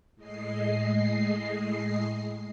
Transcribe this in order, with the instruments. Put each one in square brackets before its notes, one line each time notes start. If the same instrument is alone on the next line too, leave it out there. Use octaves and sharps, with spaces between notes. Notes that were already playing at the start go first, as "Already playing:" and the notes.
[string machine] A2 G#3 D#5 C7